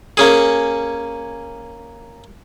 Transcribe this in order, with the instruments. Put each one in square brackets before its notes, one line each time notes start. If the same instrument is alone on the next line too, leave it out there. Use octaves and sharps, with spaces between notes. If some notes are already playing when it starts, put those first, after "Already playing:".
[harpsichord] A#3 C#4 G#4